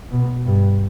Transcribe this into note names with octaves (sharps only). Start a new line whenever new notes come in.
B2
G2